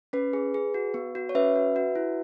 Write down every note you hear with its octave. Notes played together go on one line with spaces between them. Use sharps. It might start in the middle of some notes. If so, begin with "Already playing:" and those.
C#4 B4
G#4
G#4
F#4
B3
F#4
C#5
C#4 B4 E5
F#4
F#4
E4